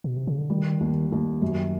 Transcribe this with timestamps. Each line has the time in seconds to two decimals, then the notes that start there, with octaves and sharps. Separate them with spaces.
0.04 B2
0.17 C3
0.27 C#3
0.38 D3
0.50 D#3 G3
0.80 D#2
1.12 D#2
1.42 F#2